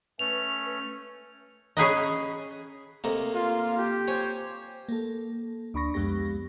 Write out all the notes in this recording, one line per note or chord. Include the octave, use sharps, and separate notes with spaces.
A3 C#4 B4 F7
C#4 G#4 B4 D#5
C3 A3 A#3 D#5
F4
G4
C5 C#5 G#5
A#3 A4
D2 D4 B5 C#6 A#6
C2 F2 G#3 B3 G4 A#6